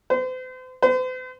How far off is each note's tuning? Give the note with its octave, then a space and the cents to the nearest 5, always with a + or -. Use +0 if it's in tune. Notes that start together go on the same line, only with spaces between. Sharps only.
C5 -40
C5 -45